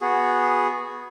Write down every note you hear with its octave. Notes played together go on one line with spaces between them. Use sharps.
B3 F#4 G#4